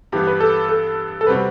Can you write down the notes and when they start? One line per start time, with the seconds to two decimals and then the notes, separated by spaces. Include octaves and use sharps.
0.12 G2 E3 B3 G4
0.27 B4
0.40 A4
0.69 A4
1.21 A4
1.27 C3 G3 C4 F#4 B4